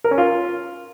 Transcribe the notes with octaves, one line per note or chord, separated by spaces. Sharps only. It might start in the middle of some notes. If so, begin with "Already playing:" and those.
A#4
C#4
F4